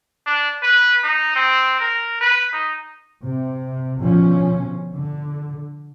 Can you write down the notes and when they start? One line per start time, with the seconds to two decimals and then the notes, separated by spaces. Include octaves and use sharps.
0.26 D4
0.63 B4
1.03 D#4
1.36 C4
1.80 A#4
2.21 B4
2.53 D#4
3.22 C3
4.00 B2 D3 F3 C#4
4.95 D3